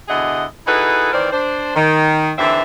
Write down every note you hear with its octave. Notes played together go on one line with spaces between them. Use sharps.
B2 D3 E4 G#4 D#5 F#5
D#4 E4 F#4 G#4 A4 B4
D#3 E3 C4 A#4 C5 D5
D4 C5
D#3
D#2 D3 E3 C4 E5